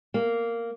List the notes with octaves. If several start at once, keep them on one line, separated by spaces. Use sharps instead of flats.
A#3